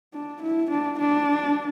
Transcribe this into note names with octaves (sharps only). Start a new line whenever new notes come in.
D4
E4
D4
D4